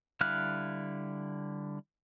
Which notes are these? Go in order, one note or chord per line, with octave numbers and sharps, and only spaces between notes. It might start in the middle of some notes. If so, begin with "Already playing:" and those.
D3 G3 E4 F5 F#6